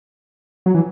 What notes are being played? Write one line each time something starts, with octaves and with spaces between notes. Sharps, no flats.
F#3
E3